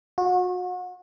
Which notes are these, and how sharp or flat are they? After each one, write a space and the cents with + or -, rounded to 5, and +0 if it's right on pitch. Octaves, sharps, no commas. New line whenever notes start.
F#4 -35